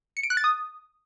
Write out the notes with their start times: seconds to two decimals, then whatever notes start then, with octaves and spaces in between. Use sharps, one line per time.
0.17 C#7
0.23 D7
0.30 F#6
0.37 A6
0.44 D#6